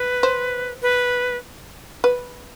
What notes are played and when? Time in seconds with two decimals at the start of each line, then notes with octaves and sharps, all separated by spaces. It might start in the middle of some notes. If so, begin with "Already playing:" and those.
Already playing: B4
0.23 C5
0.82 B4
2.04 B4